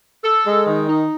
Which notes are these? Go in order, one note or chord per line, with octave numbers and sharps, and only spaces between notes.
A4
G#3
D#3
D#4